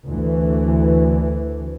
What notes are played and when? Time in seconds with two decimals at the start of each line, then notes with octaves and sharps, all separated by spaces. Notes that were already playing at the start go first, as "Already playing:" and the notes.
0.11 D2 E3